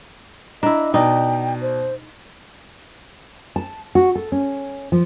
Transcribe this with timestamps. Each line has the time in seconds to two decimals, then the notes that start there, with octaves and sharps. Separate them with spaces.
0.63 D4 E4 D#5 A#5
0.94 B2 D#4 D5 G5
1.62 C5
3.56 A5
3.95 F#4
4.15 A4
4.32 C#4
4.92 F3